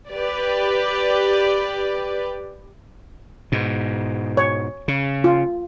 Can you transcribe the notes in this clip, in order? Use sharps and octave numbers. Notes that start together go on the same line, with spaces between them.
G4 B4 D5
G#2 B2
C#5
C#3
F4